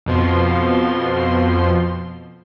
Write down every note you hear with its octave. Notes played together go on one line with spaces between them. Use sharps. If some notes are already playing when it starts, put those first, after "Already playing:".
F2 B2 F3 C6